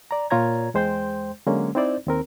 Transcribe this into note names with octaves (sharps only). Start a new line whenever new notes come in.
D5 A#5
A#2 F4 C#5 A#5 G#6
E2 G#3 C5 G5 C6 G6
D3 F#3 G#3 A#3 C#4
C4 D#4 E4 C5 D5
D#2 C4 A#4